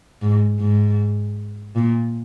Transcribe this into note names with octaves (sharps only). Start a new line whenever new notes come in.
G#2
G#2
A#2